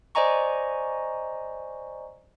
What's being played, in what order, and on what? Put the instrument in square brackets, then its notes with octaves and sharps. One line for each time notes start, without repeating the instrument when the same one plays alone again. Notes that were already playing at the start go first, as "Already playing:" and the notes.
[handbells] C5 D5 D#5 G#5 A#5 C#6